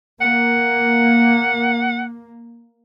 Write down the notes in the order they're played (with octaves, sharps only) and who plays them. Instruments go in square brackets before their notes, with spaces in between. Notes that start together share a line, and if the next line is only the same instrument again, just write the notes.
[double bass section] A#3 [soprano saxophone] F#5